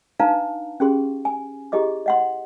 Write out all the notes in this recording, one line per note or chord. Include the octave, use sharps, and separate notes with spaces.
D4 D#4 B4 F5 A5 A#5
C#4 G4 G#4 C6
G#5
E4 G4 G#4 D#5 D6
D#5 F#5 C6